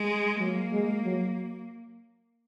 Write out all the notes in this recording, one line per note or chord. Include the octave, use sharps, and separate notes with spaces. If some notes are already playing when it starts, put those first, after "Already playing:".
Already playing: G#3
F#3 A#3
G#3
F#3